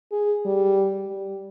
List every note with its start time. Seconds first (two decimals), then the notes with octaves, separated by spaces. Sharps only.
0.12 G#4
0.46 G3
1.06 G3